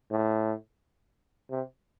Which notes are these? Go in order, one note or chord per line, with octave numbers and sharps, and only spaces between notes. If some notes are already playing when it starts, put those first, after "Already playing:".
A2
C3